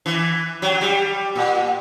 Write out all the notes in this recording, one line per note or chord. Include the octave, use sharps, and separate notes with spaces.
E3
F#3
G3
A#2